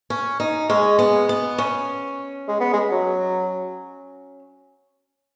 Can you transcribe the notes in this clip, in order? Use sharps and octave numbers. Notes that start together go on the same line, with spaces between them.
C#4
D#4
G#3 C#4
B3
B3
C#4
G#3
B3
G#3
F#3